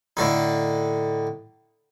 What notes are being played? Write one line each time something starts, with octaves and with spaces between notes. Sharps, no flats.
A2 D3 D#4